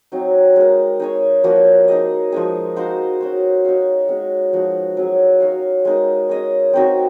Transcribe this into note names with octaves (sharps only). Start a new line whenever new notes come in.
F#3 C4 D#4
G#3 D#4 A#4
D#4 G#4 C#5
F3 A#3 C#4 F#4
D#4 G#4 D#5
F3 G#3 D#4 G#4
D#4 F#4 C5 F5
C#4 F#4 C5
D#4 F#4 C#5 F5
G#3 C#4 F#4
F3 G#3 D#4 F#4
F#3 C#4 G#4
D#4 F#4 C#5 F5
G#3 D#4 A#4
C#4 G#4 D#5
C4 D#4 F#4